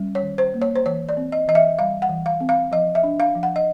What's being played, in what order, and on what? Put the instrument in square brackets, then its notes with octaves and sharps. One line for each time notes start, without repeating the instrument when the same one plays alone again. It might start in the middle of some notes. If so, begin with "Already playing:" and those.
Already playing: [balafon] G3 C#4
C#5
D#3
C5
A#3
C#5
C5
E3 C#5
D5
C4
D#5
E3 D#5
E5
G3 F5
F#5
E3
F5
C4
F5
F3 D#5
E5
D4
F5
F3
F#5
D#5